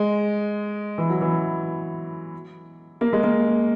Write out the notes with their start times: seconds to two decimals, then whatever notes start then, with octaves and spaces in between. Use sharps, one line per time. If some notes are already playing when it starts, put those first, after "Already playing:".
Already playing: G#3
0.98 E3
1.09 F#3
1.21 E3
3.01 A#3
3.13 G#3
3.23 A#3